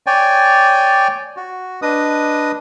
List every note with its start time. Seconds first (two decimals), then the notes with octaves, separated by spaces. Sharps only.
0.07 C#5 D5 G5 G#5
1.37 F#4
1.82 D4 B4 D#5 D#6